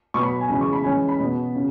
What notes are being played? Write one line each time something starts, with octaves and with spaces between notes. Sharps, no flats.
B2 F#3 B3 C#6
B5
G#5
C#3 E3 G#3 B5
C#6
B5
E3 G#3 C#4 G#5
B5
B2 B3
C#3